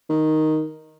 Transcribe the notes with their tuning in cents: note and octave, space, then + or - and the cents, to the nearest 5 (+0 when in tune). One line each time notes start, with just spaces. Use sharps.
D#3 +0